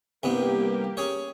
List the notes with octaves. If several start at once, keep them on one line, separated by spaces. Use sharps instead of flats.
C2 G2 A#3 B3 G4
C#4 G#4 C#5